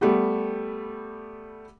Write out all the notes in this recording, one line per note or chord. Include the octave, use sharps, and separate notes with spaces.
G3 A3 B3 G4